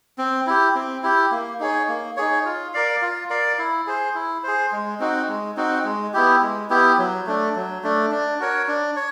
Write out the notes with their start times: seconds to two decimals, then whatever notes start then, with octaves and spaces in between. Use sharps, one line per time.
0.18 C4
0.47 E4 G4
0.75 C4
1.03 E4 G4
1.31 A#3
1.60 D#4 G#4 C#5
1.88 A#3
2.17 D#4 G#4 C#5
2.45 F4
2.73 A#4 D5 F5
3.02 F4
3.30 A#4 D5 F5
3.59 E4
3.87 G#4 C5
4.15 E4
4.44 G#4 C5
4.72 G#3
5.00 C4 D#4 F#4
5.29 G#3
5.57 C4 D#4 F#4
5.85 G#3
6.14 B3 E4 G4
6.42 G#3
6.70 B3 E4 G4
6.98 F#3
7.26 A3 D4
7.55 F#3
7.83 A3 D4
8.12 D4
8.40 F#4 A#4 C#5
8.68 D4
8.96 C#5